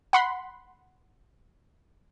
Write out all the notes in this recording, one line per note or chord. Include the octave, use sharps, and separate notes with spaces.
F#5 B5 C6